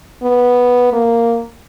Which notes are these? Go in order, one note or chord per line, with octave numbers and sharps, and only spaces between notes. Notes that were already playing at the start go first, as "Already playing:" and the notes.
B3
A#3